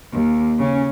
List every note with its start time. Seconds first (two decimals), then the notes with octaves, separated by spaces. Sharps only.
0.13 D#2
0.59 C#3 C#4